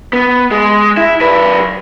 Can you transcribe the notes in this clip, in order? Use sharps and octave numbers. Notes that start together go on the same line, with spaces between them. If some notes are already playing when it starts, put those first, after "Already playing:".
B3
G#3
E4
F#2 B4